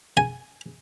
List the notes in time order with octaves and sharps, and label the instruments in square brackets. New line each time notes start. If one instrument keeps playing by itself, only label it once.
[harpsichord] G#5